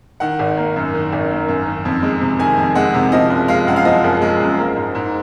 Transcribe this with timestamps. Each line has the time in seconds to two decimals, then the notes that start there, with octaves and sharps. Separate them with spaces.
0.20 D#3 F#5
0.39 G#1
0.57 A#3
0.76 F#2
0.94 D#3
1.12 G#1
1.30 A#3
1.48 F#2
1.66 D#3
1.85 F2
2.03 G#3
2.21 C3
2.39 D#3 G#5
2.57 F2
2.75 G#3 F#5
2.94 C3
3.12 F3 D#5
3.30 F#1
3.48 G#3 F5
3.67 F#2 F#5
3.76 F5
3.85 F3 D#5
4.04 F#1
4.22 G#3
4.40 F#2
4.59 A#3
4.76 G#2
4.95 G#2